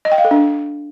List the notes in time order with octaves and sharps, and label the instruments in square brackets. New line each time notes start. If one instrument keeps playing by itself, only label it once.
[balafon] D#5
G5
F5
A4
D4